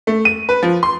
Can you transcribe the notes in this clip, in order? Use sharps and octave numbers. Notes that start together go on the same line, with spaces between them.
A3
D#7
B4
F3
C6